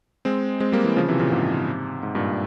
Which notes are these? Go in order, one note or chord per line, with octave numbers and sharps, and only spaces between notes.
G#3 C4
G#3 C4
G3 A#3
E3 G3
C#3 F3
C3 E3
A#2 C#3
G#2 C3
G#2
G2 A#2